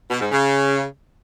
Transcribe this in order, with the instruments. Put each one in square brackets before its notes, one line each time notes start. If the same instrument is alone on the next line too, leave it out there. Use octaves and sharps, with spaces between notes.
[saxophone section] B2
G#2
C#3